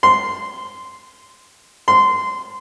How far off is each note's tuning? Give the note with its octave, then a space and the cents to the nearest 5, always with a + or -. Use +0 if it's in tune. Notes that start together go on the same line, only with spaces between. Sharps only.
C6 -10
C6 -20